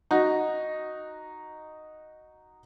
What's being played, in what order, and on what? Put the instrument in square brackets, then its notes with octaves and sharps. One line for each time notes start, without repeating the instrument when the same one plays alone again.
[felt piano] D#4 F#4